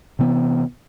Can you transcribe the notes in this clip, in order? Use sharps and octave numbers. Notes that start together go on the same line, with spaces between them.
C3 E3 B3